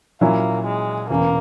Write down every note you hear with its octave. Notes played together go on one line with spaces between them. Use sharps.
A#2 F#3 A#3 C#4 E4
G#3
E1 E2 C#3 A#3